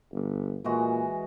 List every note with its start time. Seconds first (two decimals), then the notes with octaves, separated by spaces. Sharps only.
0.11 G1
0.65 A#2 E3 G#3 F#4